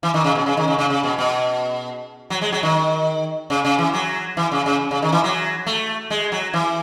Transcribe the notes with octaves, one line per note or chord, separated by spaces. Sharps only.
E3
D#3
C#3
B2
C#3
D#3
C#3
C#3
C#3
B2
B2
F#3
G#3
F#3
D#3
C#3
C#3
E3
F#3
E3
C#3
C#3
C#3
D#3
E3
F#3
A3
G#3
F#3
E3